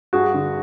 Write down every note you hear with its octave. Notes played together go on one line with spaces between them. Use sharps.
G2 F#4 G#4
D3